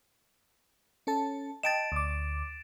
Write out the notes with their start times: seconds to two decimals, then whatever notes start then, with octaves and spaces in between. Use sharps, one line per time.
1.07 C#4 A4 A5
1.63 D#5 G5 A5 A6 D7 E7
1.92 D2 D6